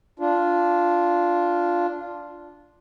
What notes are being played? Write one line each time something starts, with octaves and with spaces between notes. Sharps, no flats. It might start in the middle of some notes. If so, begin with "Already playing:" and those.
D4 F4